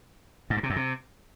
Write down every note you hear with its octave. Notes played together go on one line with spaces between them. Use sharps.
G#2
G2
C3
F#2
C3